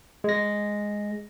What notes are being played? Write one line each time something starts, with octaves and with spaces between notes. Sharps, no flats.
G#3 A#6